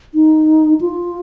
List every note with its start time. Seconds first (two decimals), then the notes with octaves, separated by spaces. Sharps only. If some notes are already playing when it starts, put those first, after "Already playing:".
0.14 D#4
0.81 F4